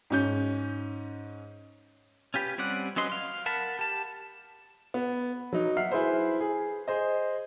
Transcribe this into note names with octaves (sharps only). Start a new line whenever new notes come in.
G#2 C#4 G6
C#4 F4 G4 B4
G3 C4 C#4 D5 F#5
F#3 C#4 B4 D#5 C6
F5 C6
A#4 F#5 A5 B5
G4 A5
B3
F#3 D#4
E5 F#5 F6 C7
E4 G#4 B4 C5 E5
G#4
G#4 C5 D#5